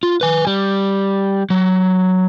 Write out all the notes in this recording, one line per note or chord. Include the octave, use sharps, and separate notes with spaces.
F4
B4 G#5
G3
F#3